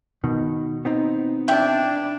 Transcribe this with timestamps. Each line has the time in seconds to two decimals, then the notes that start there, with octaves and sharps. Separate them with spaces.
0.24 B2 D#3
0.85 B3 C4 D#4
1.48 D4 E4 G5